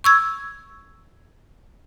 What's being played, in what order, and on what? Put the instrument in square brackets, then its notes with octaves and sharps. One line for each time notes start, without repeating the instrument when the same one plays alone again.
[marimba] C#6 E6 G#6